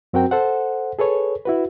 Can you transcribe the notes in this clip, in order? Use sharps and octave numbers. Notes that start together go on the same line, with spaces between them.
F#2 C4 F#4 A#4 G5
A4 C5 F#5
G#4 A4 B4 C#5
E4 F#4 B4